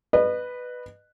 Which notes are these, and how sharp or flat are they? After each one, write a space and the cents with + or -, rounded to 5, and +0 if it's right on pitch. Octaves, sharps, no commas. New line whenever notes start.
B4 +0 D#5 -35